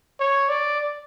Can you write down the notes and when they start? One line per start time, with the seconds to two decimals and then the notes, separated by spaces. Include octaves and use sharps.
0.20 C#5
0.49 D5